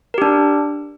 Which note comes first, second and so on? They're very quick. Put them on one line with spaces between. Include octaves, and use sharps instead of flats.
A#4 G4 D4